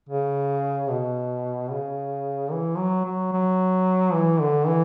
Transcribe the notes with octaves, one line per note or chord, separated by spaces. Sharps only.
C#3
B2
C#3
E3
F#3
F#3
F#3
E3
D3
E3